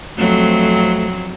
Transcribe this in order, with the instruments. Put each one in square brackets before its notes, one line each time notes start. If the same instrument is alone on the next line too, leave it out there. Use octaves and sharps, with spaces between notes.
[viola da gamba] F2 F#3 C4 [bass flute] A3